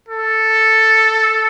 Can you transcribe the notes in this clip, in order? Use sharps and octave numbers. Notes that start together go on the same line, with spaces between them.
A4